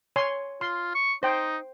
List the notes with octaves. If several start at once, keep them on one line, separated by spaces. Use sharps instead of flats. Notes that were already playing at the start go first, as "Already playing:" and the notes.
C#5 G#5 C6
F4 C6
C#6
D#4 C5 G5